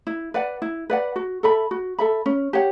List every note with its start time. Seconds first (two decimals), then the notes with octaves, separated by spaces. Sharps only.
0.07 E4
0.34 B4 D5 F#5
0.62 E4
0.90 B4 D5 F#5
1.16 F#4
1.43 A4 E5 B5
1.71 F#4
1.98 A4 E5 B5
2.26 C#4
2.53 G4 C#5 F#5